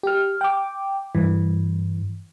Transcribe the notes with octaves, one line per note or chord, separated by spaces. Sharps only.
G4 F6
G5 D6
G2 E3